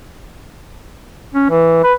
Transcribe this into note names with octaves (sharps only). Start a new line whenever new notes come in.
C#4
E3
B4